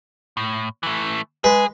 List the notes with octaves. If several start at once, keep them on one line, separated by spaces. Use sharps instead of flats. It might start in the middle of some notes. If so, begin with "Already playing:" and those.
A2
E3 A3
G#3 G#4 B4